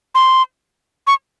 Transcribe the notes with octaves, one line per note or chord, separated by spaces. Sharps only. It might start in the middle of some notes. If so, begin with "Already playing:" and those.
C6
C#6